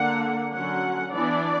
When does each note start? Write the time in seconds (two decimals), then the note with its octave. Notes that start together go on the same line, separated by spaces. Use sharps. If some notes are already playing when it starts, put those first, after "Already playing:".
Already playing: D3 A#3 D4 F#5
0.52 D3 F#3 C#4 F#5
1.13 E3 B3 D4 D5